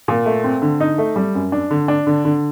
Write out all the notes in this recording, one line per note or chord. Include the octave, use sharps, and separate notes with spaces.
A#2
A3
C4
D3
D#4
A3
G3
F#2
D4
D3
D4
D3
D3